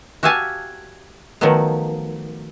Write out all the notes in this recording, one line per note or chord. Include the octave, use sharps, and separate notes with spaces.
F#4 G4 E5 F5 G#5 A5
D#3 F3 F#3 A3 B3